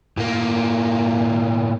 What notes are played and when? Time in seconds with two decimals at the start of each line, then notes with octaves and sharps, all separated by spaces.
0.17 A2 A#3